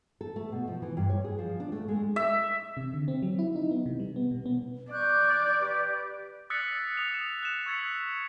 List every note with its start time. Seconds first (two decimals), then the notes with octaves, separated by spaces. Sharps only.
0.21 A4
0.36 A3
0.52 B2
0.68 F3
0.82 E3
0.97 G2
1.10 C#5
1.24 G#4
1.38 F3
1.60 D4
1.72 A3
1.88 G#3
2.16 E5
2.77 C3
2.94 D3
3.08 C4
3.22 F#3
3.39 E4
3.56 D#4
3.71 B3
3.86 C3
3.99 G3
4.16 B3
4.31 B2
4.46 B3
4.91 D5 C#6 F#6 G6
5.59 G4 B4 D6
6.50 D#6 E6 F#6 A6 B6 C#7
6.97 D#6 F7
7.14 E7
7.43 F#6 E7
7.66 C#6 E6 G#6 A6 B6 C#7